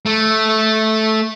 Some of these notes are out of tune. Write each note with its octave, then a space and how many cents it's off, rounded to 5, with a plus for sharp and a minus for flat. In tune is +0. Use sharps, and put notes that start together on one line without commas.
A3 -10